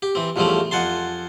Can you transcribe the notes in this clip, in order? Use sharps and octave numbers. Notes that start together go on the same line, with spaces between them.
G4
E3 C4
E2 F3 G3 A3 C4 C#4
F2 F#5 G#5 A5 C6